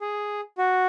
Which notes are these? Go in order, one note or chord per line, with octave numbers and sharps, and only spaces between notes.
G#4
F#4